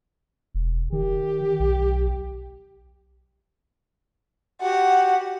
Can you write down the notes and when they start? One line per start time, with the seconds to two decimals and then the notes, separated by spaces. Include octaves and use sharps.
0.55 E1
0.92 D#3 G4
1.60 B1
4.62 F#4 G4 F#5